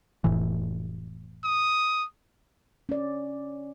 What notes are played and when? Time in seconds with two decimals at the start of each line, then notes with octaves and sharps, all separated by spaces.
0.24 F1 A2 E3
1.44 D#6
2.89 C#4 D5